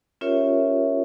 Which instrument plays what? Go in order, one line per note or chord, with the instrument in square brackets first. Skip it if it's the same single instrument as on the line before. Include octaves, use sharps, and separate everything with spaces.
[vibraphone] C#4 F4 G4 A#4 C#5 E5